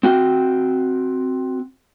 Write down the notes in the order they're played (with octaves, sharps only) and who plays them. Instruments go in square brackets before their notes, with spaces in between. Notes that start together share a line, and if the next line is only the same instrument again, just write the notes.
[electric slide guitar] C4 F#4 G5